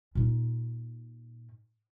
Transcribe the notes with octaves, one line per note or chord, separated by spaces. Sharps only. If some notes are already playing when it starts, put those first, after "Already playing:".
A#2 D#4